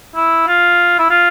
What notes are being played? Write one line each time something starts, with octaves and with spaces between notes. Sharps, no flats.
E4
F4
E4
F4